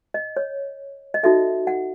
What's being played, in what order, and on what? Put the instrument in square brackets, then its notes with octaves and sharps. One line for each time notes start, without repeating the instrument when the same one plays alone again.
[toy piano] D#5
C#5
D#5
D#4 F#4 A4 E5
F#5